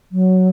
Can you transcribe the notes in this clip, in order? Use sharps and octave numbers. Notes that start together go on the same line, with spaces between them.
F#3